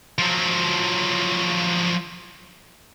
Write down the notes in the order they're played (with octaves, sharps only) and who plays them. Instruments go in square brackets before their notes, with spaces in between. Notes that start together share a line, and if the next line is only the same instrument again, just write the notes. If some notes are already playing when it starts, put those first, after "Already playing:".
[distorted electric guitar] F3 F#3